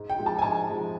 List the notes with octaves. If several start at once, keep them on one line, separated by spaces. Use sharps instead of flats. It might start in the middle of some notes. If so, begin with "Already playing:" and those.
Already playing: G#2
G5
F3 G#3
A5
G#5
G#2 A5
F3 G#3